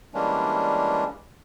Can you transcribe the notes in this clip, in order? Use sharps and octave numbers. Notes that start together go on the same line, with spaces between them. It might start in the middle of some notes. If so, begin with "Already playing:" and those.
E3 G3 G#3 A#3 C#4 D4